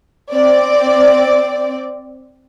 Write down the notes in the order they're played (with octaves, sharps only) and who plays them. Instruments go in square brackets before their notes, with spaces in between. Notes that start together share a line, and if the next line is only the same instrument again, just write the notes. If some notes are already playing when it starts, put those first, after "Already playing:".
[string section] C4 D5